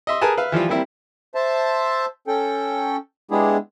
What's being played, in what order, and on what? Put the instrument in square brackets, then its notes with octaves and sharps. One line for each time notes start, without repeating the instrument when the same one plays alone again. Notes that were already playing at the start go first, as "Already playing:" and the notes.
[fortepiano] D#5 E5 C6
G#4 A#4 B4 G#5 A5
B4 E5 F5
E3 F3 G3 F4
G3 A#3 C4 E4
[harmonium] C5 E5 A5
C#4 A4 G5
G#3 B3 D4 E4 G4 G#4